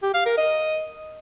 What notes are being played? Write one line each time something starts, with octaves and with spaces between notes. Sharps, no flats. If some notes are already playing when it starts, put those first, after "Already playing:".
G4
F5
A#4
D#5